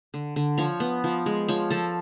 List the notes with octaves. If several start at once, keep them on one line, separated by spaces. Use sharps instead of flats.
D3
D3
F3 C#5
B3
F3
G#3
F3 C#5
F3 A4